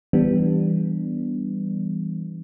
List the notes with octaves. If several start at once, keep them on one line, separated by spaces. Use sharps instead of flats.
E3 G3 B3 D4